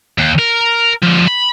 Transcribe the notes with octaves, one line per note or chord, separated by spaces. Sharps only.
D#2
A#4
D3 F3
B5